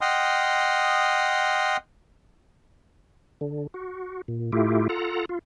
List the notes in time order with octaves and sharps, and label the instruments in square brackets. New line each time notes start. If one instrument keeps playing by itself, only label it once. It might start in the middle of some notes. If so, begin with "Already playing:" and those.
[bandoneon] D#5 F#5 G5 C6 D#6 F6
[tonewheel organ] D3
F#4
A#2
A2 A3 E4 F4 G4
F4 A4 F#5 A#5
F4